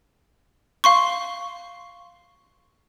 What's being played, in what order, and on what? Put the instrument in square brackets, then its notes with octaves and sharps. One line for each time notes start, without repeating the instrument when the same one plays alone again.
[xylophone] F5 C6 C#6